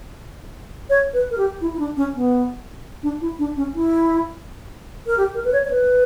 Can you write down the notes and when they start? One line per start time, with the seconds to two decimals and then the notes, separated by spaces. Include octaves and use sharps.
0.90 C#5
1.13 B4
1.31 A#4
1.38 G4
1.61 E4
1.74 E4
1.79 D4
1.96 C#4
2.15 B3
3.03 D4
3.21 E4
3.39 D4
3.57 C#4
3.75 E4
5.06 A#4
5.17 G4
5.34 A#4
5.44 B4
5.53 C#5
5.65 C#5
5.71 B4